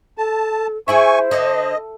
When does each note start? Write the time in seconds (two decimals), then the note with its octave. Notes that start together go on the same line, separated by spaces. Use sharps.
0.18 A4 A5
0.88 E4 G#4 C5 E5 G#5 C#6
1.31 D3 D#5